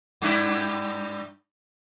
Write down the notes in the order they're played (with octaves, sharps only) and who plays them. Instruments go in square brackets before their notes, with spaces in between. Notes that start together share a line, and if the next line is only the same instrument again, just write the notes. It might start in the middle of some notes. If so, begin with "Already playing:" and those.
[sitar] G2 D4 E4